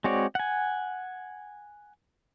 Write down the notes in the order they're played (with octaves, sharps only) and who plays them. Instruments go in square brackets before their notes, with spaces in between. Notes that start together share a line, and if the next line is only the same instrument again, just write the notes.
[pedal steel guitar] G#3 C4 F#4 C#5 D5
F#5 G#5